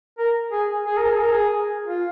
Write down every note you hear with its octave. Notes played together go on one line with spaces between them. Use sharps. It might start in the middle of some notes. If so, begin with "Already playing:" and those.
A#4
G#4
G#4
A#4
G#4
A#4
G#4
F4